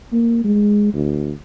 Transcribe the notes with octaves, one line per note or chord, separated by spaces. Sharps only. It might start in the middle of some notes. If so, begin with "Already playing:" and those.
A#3
G#3
D2